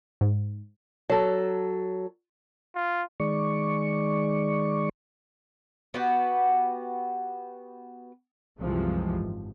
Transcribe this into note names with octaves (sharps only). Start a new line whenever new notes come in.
G#2
F#3 A4
F4
D#3 G#3 D5 C#6
B3 F#4 G4
C2 F#2 C3 E3 F3 G#3
G#1